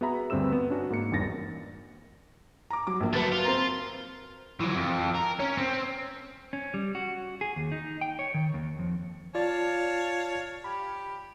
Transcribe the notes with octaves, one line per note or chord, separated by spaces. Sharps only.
B3 F#4 G#4 E5 A#5 B5
D2 G2 C4 B4 E6 E7
B3
C#4 D4 F#4
G#2 A#3 C#7
G#1 E2 G2 D#3 A6 A#6
A#5 D6
F#3 D6
A#1 A#3
D3 F#3 A3 B4 A6
F4
C4 A#4 A#5
E3 F#3
F2
A#4
C#4
C4
C#4
G3
F#4
G#4
D#2
D#4
G5
C#5
D#3
D#2
F2
F4 C#5 D5 F5 A5 A6
G4 B5